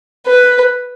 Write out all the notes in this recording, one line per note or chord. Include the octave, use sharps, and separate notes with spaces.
B4